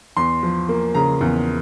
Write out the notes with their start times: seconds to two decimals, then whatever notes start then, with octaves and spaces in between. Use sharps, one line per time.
0.17 E2 C6
0.43 F3
0.69 A#3
0.95 C#3 A#5
1.21 E2